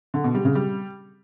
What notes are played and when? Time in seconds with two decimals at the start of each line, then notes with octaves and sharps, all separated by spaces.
0.14 D3
0.24 B2
0.35 G3
0.45 C#3
0.55 G3